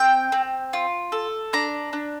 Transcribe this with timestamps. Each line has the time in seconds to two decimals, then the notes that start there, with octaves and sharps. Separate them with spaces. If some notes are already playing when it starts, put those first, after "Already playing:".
Already playing: C4 G5
0.32 C4
0.73 F4
1.12 A4
1.53 D4 A#5
1.93 D4